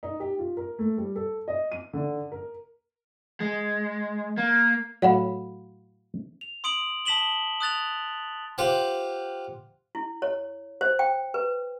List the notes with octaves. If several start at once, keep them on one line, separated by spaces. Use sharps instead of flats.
D#4
G4
F4
A#4
A3
G3
A4
D#5
D#7
D3
A#4
G#3
A#3
A2 F#3 F5 F#5 B5
F7
C6 D#6 D7 F#7
A5 D#6 B6 E7 F#7 G7
D#6 F#6 A6 F7
F4 G4 C5 F#5
E4
C#5
C5
G5
B4